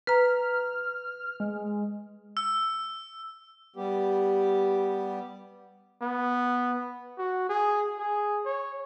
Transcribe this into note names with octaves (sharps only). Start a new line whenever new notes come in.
B4 A#5 F6
G#3
E6
G3 B3 G4
B3
F#4
G#4
G#4
C#5